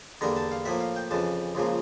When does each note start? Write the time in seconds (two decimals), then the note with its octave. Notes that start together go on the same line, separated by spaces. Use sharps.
0.21 E2 D3 G3 A#3 A#5
0.37 A5
0.52 F5
0.65 A2 F3 A#3 E5
0.81 F5
0.96 G5
1.11 F2 C#3 E3 A5
1.55 C#2 C#3 F3 A#3